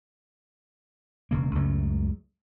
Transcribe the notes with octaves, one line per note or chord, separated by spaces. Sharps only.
E1 C#3 A#3
C#2 F#2 C#3 A3